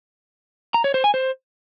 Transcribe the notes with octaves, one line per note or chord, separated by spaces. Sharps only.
A#5
C#5
C5
G#5
C5